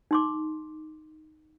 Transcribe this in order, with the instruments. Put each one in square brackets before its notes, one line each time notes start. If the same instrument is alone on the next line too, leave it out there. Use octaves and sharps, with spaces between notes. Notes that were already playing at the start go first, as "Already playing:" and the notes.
[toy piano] D#4 C6 D6